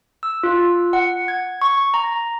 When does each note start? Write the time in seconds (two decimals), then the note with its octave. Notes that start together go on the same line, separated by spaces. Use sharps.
0.23 E6
0.43 F4
0.93 F#5
1.28 G#6
1.62 C#6
1.94 A#5